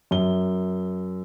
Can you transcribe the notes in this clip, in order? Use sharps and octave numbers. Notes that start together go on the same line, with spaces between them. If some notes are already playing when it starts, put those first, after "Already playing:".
F#2 G7